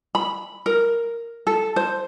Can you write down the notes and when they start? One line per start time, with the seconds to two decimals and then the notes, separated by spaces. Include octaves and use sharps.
0.15 B5
0.66 A#4
1.47 A4
1.76 C5